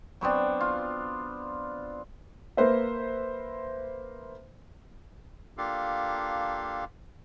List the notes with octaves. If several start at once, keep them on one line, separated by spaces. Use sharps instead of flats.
F#3 B3 C4 D4
F4
A#3 B4 C5 E5
A#3 D4 F4 G4 A4 F5